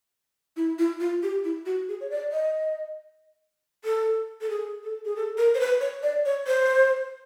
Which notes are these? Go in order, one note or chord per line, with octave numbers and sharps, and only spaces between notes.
E4
E4
F4
G4
E4
F#4
G#4
C#5
D5
D#5
A4
A4
G#4
A4
G#4
A4
A#4
C5
B4
C#5
D5
C#5
C5